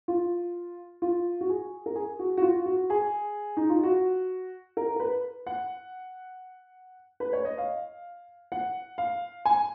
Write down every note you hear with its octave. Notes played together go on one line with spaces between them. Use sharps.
F4
F4
F#4
G#4
A#4
G#4
F#4
F#4
F4
F#4
G#4
D#4
F4
F#4
A#4
A#4
B4
F#5
B4
C#5
D#5
F5
F#5
F5
G#5